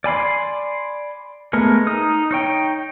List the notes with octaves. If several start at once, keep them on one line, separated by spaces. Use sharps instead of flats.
D5 G#5 B5 C6
G#3 A3 B3 A#4
D#4 D#6
D#4 C#5 G5